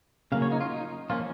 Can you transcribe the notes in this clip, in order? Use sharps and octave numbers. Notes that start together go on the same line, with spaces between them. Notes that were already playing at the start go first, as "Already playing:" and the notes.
C#3 F#3 A#3 C#4 F5
C#5
D#4
F4
D#4
F3 A#3 C#4 F4